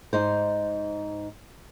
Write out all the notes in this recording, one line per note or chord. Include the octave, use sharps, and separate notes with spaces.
G#2 D#4 C5